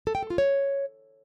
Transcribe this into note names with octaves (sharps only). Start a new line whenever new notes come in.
A4
G5
A4
F4
C#5